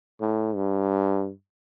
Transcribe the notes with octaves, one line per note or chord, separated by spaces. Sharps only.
A2
G2